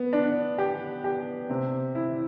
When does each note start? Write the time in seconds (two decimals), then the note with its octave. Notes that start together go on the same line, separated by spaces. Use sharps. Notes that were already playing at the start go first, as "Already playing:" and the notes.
Already playing: B3
0.13 D4
0.58 G4
1.04 G4
1.49 C3
1.95 E4